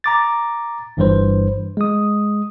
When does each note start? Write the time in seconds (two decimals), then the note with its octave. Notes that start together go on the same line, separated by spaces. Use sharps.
0.04 A#5 D6 A6
0.97 G1 G2 E3 G3 B4 C5
1.77 G#3 D#6